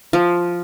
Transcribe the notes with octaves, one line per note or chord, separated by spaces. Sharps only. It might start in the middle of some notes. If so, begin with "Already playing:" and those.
F3